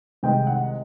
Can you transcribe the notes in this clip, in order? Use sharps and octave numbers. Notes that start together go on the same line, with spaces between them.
C2 C3 D#3 G#3 G5
F#5